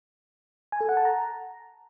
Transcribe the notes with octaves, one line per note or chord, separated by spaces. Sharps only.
G#5
A4
F#5
A5
A#5